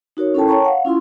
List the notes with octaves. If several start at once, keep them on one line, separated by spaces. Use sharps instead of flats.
D#4 F#4 A#4 C#5
C#4 E4 A4 A#4 G5 A5
C#5 G5 A5 A#5 C#6
F5 F#5
C#4 E4 F4 C6